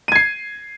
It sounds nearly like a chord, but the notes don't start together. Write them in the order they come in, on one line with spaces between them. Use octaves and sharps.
D#7 G#6 C7